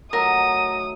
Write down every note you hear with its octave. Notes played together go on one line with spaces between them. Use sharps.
D#3 F#3 A3 A#4 D#6